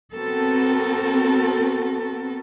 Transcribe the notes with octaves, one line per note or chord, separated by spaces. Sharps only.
B3 C4 F#4 A4 A#4